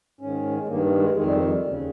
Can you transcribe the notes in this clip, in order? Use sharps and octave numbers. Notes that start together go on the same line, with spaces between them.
G#2 D#3 C#4
G#3
G2 D#3 A#3
G#3
F2 D#3 G#3
G3
F3
G3
D#2 C#3